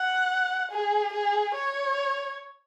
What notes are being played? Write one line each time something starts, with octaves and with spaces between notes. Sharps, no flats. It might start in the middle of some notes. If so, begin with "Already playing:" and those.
Already playing: F#5
G#4
G#4
C#5